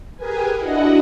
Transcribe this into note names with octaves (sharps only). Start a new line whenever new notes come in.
G4 G#4 A#4 B4 G#5
D4 E4 F#4 D#5 F#5